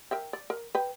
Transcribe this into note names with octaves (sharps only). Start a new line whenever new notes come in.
A#4 E5 G5
D5
A#4
B4 G5